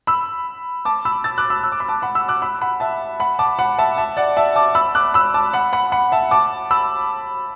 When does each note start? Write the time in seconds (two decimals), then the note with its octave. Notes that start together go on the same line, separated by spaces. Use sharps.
0.07 B5 E6
0.85 A5 D6
1.05 B5 E6
1.24 E6 A6
1.38 D6 F#6
1.50 B5 E6
1.64 E6
1.72 D6
1.80 B5
1.88 A5 D6
2.02 F#5 B5
2.15 B5 E6
2.28 D6 F#6
2.42 B5 E6
2.61 F#5 B5
2.80 E5 A5
3.20 F#5 B5
3.39 A5 D6
3.59 F#5 B5
3.78 E5 A5
3.98 E5 A5
4.17 D5 F#5
4.37 E5 A5
4.56 A5 D6
4.75 B5 E6
4.95 D6 F#6
5.14 B5 E6
5.34 A5 D6
5.53 F#5 B5
5.73 F#5 B5
5.92 F#5 B5
6.12 E5 A5
6.31 A5 D6
6.71 B5 E6